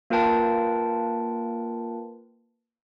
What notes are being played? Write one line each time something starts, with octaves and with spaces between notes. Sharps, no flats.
A#3 F4 A#4 B4 G5 A5